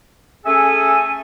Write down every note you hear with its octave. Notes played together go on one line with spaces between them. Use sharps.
A3 C#4 G#4 A4 E5 G#5